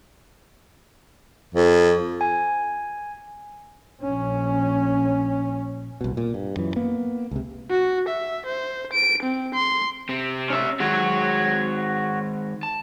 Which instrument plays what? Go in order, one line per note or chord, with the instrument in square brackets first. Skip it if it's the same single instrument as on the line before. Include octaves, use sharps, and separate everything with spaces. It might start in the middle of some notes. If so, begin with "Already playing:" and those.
[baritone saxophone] F2
[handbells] G#5
[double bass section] A#1 C#4
[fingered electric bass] C2 B2
A#2
G2
F#2 E3
A#3 B3
C#2 C3
[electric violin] F#4
E5
C5
D7
C4
C6
[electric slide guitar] C3 C4
[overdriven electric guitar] C#4 E5
[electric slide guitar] D#3 G#3 [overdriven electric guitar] F#4 C#5
[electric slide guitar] A5